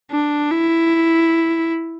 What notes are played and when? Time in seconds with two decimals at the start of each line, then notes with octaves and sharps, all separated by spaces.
0.12 D4
0.52 E4